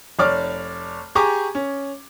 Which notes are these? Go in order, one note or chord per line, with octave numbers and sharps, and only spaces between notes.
F1 C#5 D5 D6 F6
G4 G#4 G#5 A#5 C#6 D6
C#4